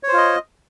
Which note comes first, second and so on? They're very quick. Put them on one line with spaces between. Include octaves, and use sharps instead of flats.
C#5 C5 F4 D#5